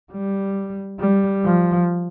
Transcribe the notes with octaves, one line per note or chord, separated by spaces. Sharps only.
G3
G3
F3